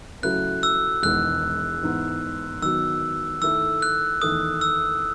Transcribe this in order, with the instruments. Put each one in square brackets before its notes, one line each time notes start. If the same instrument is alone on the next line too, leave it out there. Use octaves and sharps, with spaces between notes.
[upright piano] C#3 F#3 A3 E4 [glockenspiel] F#6
[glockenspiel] E6
[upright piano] E1 E2 D#3 G#3 B3 [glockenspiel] F#6
[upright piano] G#2 E3 B3
[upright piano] D#3 F#3 B3 F#4 [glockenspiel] E6
[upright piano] D#3 A3 E4 A4 [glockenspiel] E6
[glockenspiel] F#6
[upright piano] E2 D#3 A3 [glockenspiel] D#6
[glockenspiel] E6